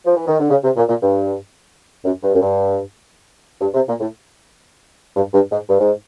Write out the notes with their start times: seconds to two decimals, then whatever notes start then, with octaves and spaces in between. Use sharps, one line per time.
0.04 F3
0.15 E3
0.27 D#3
0.39 D3
0.49 C#3
0.64 C3
0.76 A#2
0.88 A#2
1.01 G2
2.05 F#2
2.23 G2
2.33 F#2
2.40 G2
3.60 G2
3.74 C3
3.87 A#2
4.00 A2
5.16 G2
5.33 G2
5.50 G#2
5.68 G2
5.79 G#2